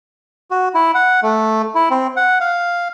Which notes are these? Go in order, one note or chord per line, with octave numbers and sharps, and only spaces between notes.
F#4
E4
F#5
A3
E4
C4
F#5
F5